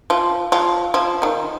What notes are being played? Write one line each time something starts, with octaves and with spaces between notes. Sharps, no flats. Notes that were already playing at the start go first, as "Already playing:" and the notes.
F3 F4
F3 F4
F3 F4
D#3 D#4